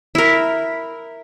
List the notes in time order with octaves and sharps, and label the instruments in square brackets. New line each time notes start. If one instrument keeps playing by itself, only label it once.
[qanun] E4 A#4